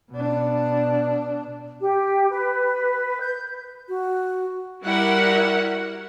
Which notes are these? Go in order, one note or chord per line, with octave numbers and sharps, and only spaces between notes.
B2 D4
G4
B4
G6
F#4
G3 E4 F#4 A#4 F#5